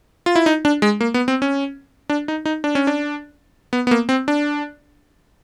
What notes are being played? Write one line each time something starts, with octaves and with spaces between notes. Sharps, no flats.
F4
E4
D#4
D4
G#3
A#3
B3
C4
C#4
D4
D#4
D#4
D4
C#4
D4
B3
B3
A#3
C4
D4